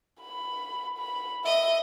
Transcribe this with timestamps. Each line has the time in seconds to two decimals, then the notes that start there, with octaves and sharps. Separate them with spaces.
0.22 B5
0.98 B5
1.45 D#5 E5